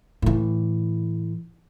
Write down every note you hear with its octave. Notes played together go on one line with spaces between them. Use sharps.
A2 E3